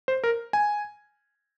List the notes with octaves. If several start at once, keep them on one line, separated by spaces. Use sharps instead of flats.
C5
A#4
G#5